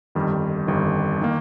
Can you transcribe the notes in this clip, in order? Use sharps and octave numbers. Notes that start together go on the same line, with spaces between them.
G1 F2 D#3 G3
G1 F2 D#3 G3
D#3 A#3